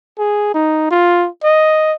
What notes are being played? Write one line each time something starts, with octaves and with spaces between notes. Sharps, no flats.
G#4
D#4
F4
D#5